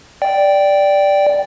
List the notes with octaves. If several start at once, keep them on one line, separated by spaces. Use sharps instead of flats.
D5 G5